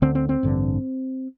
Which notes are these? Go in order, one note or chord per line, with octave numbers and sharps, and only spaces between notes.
D2 D3 C4
C4
C4
A1 G2 D3